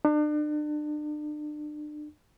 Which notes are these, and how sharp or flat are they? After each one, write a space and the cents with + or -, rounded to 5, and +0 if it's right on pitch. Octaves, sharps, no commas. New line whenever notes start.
D4 +35